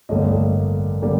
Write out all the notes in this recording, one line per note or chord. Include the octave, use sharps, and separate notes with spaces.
A1 G2 D3 G3 A#3 D#5
D3 G3 A#3